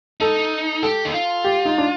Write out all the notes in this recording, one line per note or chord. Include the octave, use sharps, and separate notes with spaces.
D#4 A4
G4 A4
D#4
F4
G4
D#4
D4